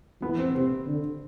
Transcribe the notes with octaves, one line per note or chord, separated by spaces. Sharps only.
E3 B3
C4
C3 C4
D3